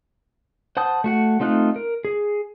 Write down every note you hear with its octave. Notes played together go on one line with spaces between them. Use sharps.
C5 F#5 A5 D#6 G6
A3 F#4 F#5
A3 C4 D#4 F4 F#6
A#4
G#4